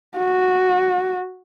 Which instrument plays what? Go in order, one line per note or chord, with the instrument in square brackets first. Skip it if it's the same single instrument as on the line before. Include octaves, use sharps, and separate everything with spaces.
[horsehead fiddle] F#4